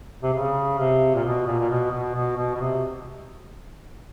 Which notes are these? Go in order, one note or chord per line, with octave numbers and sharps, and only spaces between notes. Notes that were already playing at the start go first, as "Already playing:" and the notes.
C3
C#3
C3
A#2
B2
A#2
A#2
B2
B2
B2
B2
B2
C3